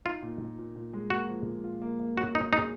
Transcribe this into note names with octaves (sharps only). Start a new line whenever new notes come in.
D#4 F4
A#2
A#2
A#2
A#2
G#3
A#3 F#4
F3
A#2
F4
A#3
A#3
F#3 F#4
F#3 D#4
D#4 G#4